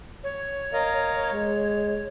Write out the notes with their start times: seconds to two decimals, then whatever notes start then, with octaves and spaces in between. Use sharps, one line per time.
0.24 C#5
0.73 A#4 D#5 F5
1.32 G#3